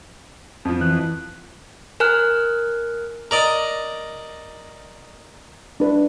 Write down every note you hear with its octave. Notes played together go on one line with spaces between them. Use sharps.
F2 F3
E3 F#6
A#4 G#5 F6 F#6
A#4 D5 D#5
D4 B4